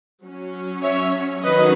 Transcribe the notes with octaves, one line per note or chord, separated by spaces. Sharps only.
F#3 C#4
C#5 E5
D#3 F#3 C#4 B4 D#5